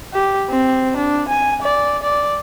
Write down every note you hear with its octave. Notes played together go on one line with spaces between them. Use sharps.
G4
C4
D4
G#5
D5
D5